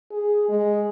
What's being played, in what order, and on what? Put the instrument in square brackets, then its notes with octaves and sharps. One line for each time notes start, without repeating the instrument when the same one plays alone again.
[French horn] G#4
G#3